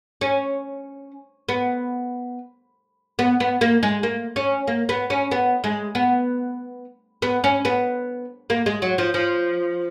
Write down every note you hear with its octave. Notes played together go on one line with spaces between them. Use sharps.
C#4
B3
B3
B3
A#3
G#3
A#3
C#4
A#3
B3
C#4
B3
G#3
B3
B3
C#4
B3
A#3
G#3
F#3
F3
F3